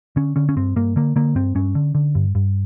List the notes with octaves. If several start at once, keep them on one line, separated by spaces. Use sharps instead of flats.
D3 C#4
D3 C#4
C#4
G2 C4
G2 A#3
D3 A#3
D3 A#3
G2 C4
G2 C#4
D3
D3
G2
G2